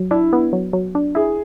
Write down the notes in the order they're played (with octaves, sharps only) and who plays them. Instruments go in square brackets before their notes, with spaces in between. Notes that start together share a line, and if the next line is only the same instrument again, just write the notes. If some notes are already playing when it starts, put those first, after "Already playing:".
Already playing: [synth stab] F#3
[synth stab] D4 [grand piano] E4
[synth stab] B3
F#3
F#3
D4
[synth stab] E4 [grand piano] G#4